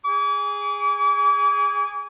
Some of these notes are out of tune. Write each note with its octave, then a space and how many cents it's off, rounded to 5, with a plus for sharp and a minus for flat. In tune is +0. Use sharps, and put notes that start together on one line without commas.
G#4 -15 D6 -40